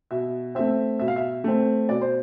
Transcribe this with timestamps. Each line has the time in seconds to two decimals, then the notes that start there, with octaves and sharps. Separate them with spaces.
0.11 B2 E5
0.55 A3 C4 E5
1.00 B2 E5
1.08 F5
1.16 E5
1.44 A3 C4
1.89 B2 D5
2.01 C5